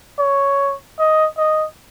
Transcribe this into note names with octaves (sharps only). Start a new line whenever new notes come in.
C#5
D#5
D#5